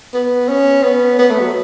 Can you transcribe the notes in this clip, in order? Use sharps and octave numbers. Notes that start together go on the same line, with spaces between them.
B3
C#4
B3
B3
A3
F#3